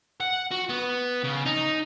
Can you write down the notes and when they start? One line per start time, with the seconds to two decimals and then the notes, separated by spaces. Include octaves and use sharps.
0.20 F#5
0.51 F#4
0.69 B3
1.24 C#3
1.46 D#4